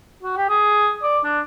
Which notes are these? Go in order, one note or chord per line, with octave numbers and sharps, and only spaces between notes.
F#4
G4
G#4
D5
D4